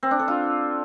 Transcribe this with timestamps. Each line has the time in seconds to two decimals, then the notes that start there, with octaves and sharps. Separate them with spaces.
0.03 C4
0.11 D4
0.19 A4
0.28 F4